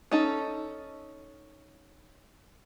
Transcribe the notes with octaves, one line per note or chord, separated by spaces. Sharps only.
C#4 D#4 A4